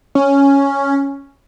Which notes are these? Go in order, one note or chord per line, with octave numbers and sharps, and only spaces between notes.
C#4